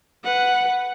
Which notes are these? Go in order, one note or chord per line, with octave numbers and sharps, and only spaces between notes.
B4 F#5